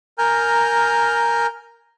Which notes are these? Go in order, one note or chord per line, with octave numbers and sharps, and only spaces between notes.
A#4 G#5 A#5 F6 G6